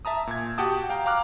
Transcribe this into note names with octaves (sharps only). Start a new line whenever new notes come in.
E5 A5 A#5 D#6
A#2 G#6
F#4 G4 F#5 G5 A5 D#6
F5 G5 A#5
F5 A#5 D6 F6 F#6